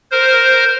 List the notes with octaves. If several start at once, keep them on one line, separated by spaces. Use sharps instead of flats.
A#4 C5